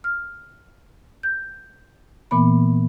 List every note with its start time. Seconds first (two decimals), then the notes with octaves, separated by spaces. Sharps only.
0.04 F6
1.23 G6
2.31 A#2 E3 A#3 B3 B5